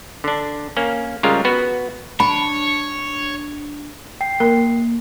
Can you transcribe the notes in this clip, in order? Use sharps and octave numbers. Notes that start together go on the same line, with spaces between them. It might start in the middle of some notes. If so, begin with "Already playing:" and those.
D3 D4
A#3 C#4
C#3 G3 G#3 F4 A#4
B3 F#4 B4
D4 C#5 B5
G5 C7
A#3 A#4